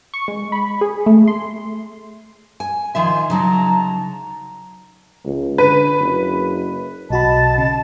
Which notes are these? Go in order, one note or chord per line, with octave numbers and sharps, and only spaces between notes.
C#6
G#3
B5
G#4
A3
C6
G#5
D#3 F3 E5 G#5 C6
C#3 F#3 D#4 A5 A#5
C#2
D3 B4
F#1
B1 F#4 D#5 A5 B5
C#3